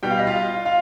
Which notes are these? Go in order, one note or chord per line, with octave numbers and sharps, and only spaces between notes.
B2 G3 B3 G5
F5
D#5
F4 F5
F4 F5